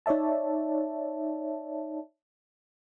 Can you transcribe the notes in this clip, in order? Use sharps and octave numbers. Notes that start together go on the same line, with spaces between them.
D#4 C#5 D5 E5 A5